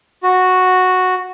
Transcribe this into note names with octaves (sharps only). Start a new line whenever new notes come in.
F#4